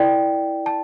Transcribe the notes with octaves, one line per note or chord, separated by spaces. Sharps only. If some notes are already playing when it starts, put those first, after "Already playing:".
Already playing: E4 A#4 D5 G5
A5